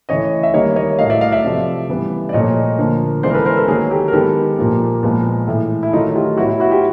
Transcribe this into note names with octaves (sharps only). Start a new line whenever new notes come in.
C#3 E3 A3 C#5 D#5
E5
D#3 G3 A#3 C#5 D#5
C#5 D#5
A2 F#3 A3 D#5 F5
D5 E5
D#5 F5
D5 E5
C3 F3 A3
C#3 E3 G3 B3
D5
A#2 F3 A3 C#5 D#5
D3 F3 A#3
C#3 E3 G#3 B3 C5 D5
A#4
A4 B4
A#4 C5
A4 B4
D#3 F#3 A#3 G#4 A#4
G4 A4
A#4
D#3 G#3 B3 G4 A4
A#2 F3 A#3
A#2 F3 G#3 B3
A2 E3 A3
E4
D#3 F#3 A3 D#4 F4
F4 G4
A2 F#3 B3 E4 F#4
E4 F#4
E4 F#4
F4 G4